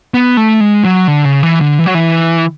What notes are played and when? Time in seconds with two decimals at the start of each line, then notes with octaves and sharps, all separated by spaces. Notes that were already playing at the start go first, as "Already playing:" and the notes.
0.14 B3
0.37 A3
0.60 G#3
0.84 F#3
1.08 D3
1.25 C#3
1.43 E3
1.61 D3
1.79 E3
1.86 F#3
1.95 E3